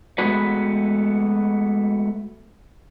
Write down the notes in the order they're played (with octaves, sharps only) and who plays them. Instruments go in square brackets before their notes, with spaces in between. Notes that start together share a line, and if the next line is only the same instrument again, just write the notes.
[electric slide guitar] G#3 A3 B3 F#4 B4